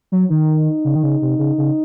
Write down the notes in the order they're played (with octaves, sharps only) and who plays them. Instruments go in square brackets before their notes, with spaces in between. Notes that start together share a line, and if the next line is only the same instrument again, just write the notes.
[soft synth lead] F#3
[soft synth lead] D#3 [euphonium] D#4
[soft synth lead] C#3
D#3
C#3
C3
C#3
C#3